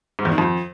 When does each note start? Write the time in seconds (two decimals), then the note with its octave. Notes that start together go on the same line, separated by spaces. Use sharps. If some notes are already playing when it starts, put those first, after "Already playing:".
0.19 G#2
0.25 E2
0.32 D#3
0.38 F2